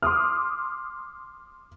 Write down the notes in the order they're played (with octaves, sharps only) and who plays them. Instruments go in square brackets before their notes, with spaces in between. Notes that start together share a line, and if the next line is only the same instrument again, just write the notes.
[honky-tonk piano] C6 D6 D#6 F6